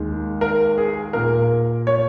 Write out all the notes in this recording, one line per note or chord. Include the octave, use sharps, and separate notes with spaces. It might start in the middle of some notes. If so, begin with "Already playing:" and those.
Already playing: D#2 D#3 G#3
A#4
G#4
A#2 A#3 A#4
C#5